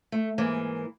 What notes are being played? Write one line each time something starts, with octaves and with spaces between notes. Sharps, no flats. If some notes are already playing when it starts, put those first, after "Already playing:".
A3
G#2 E3 A#3